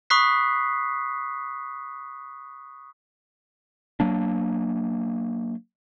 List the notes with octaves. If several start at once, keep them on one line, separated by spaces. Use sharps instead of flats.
B5 C#6 D#6 F#6 B6 C7
F#3 A#3 D4